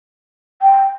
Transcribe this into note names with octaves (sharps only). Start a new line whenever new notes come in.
G5